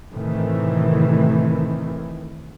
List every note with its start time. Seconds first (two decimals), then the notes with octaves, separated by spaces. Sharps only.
0.12 A2 C3 D#3 E3 A3